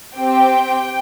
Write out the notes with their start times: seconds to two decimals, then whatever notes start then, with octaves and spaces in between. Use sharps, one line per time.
0.15 C4 G4 G5